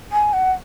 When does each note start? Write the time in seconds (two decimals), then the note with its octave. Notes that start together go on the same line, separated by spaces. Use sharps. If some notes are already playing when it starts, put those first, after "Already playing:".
0.12 G#5
0.33 F#5